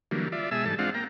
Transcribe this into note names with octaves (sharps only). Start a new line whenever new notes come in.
D3 E3 F#3 G3 A#3
F4 D5 E5
B2 G#3 E5 G#5 A5 E6
G#2 E3 G3 A4 A5
G#3 C4 D4 F4 F5 F#5
A#3 G5 A#5